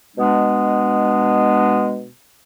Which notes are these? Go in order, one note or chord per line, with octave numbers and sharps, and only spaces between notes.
B2 G#3 B3 D4